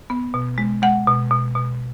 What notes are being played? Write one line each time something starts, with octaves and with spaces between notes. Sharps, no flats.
B3
B2
G#3
G#3 F#5
B2
B2
B2